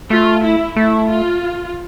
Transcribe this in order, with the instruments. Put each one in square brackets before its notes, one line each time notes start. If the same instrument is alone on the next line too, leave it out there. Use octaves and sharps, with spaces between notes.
[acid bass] A3 [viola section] F4
[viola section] E4
[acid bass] A3 [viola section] E4
[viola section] F4